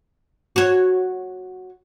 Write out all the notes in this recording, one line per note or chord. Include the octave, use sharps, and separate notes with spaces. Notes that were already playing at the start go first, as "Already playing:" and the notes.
F#4 C#5